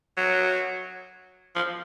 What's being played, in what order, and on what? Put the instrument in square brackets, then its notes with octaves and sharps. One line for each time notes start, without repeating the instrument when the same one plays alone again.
[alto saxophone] F#3
F3